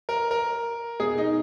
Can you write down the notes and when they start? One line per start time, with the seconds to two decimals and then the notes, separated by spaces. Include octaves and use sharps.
0.09 A#4
0.31 A#4
1.00 B2 G#4
1.18 D#4